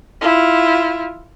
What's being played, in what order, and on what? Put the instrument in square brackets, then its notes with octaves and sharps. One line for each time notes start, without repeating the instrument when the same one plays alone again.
[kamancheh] E4 F4